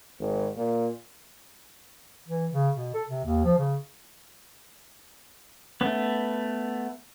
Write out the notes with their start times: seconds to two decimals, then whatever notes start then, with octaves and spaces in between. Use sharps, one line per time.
0.19 G#1
0.56 A#2
2.28 E3
2.51 C#3
2.76 B2
2.94 A4
3.08 C3
3.24 D#2
3.45 F3
3.58 C#3
5.81 A3 B3 C#4